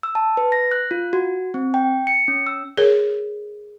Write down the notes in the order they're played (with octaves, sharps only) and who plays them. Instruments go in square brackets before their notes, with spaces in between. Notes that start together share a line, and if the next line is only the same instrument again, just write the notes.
[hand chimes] E6
A5
B4
A#6
F#6
F4
F#4
C4
G5
C#7
C#4
E6
[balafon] G#4 A#4 C#5